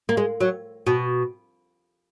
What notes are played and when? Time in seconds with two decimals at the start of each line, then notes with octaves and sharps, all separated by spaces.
0.09 A#3
0.17 G#3
0.40 F#3
0.87 B2